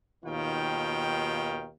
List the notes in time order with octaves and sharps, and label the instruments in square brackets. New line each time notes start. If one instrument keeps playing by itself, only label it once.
[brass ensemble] D#2 B2 D#3 F4 F5 G5